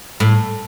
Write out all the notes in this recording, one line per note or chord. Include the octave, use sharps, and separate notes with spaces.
A2